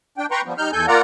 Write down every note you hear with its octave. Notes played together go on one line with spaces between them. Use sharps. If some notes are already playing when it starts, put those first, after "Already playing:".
D4 G5
B4 G5 A#5 C6 C#6
F3 G3 B3
G3 D#4 F6 G6
E2 A4 G#5 G6
A#3 F4 A#4 D5 F#5 A#5